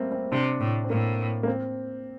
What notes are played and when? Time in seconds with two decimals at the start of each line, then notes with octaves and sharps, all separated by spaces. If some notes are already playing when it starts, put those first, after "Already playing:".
Already playing: G3 A3 A#3 C4
0.12 C4
0.32 C3 D4
0.60 A2
0.84 C4
0.90 A2 A#3
1.43 A#3
1.47 C4